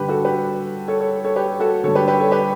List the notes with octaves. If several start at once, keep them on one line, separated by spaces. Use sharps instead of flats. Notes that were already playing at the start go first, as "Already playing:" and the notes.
Already playing: G2 D3 G4 B4
F#4 A4
G4 B4
A4 C#5
A4 C#5
A4 C#5
G4 B4
F#4 A4
G2 D3 A4 C#5
G4 B4
G4 B4
A4 C#5
G4 B4